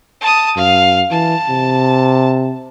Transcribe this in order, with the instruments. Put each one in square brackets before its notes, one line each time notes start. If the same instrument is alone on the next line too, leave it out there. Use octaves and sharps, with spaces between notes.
[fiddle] A5 D#6
[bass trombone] F#2 [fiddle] F5
[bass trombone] E3 [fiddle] A5
[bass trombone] C3